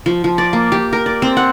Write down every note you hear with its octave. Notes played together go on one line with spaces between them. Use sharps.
F3
F3
D5
A#3
G4
A#4
D5
C4
F#5